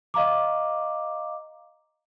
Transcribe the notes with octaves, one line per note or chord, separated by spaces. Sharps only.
D#5 F5 A#5 D6